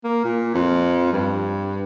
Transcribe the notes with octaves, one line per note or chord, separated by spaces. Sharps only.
A#3
A#2
F2
G2